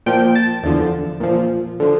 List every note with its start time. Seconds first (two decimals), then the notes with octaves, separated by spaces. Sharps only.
0.06 A#2 F3 G5
0.35 A5
0.63 E2 D3 F3
1.20 A#2 F3
1.80 D3 F3